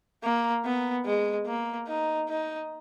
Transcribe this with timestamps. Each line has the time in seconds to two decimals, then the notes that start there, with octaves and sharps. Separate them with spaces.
0.23 A#3
0.65 B3
1.06 G#3
1.47 A#3
1.88 D#4
2.29 D#4